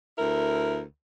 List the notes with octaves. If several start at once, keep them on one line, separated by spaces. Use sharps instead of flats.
D2 E4 A#4